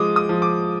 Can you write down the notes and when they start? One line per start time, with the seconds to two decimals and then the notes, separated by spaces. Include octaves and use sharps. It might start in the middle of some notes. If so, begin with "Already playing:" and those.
Already playing: F3 G#3 D6 D#6
0.16 D#6
0.29 F3
0.42 D6